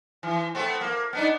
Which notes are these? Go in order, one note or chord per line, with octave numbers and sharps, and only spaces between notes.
E3
A3 B3 C4
A#3
B3 D4 D#4